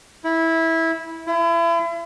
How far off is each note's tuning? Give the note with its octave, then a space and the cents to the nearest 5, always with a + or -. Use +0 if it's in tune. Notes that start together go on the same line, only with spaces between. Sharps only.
E4 -15
E4 +35